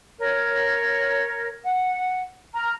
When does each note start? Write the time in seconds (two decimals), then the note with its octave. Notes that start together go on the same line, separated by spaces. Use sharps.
0.19 A#4 C#5
1.63 F#5
2.54 A#5 F6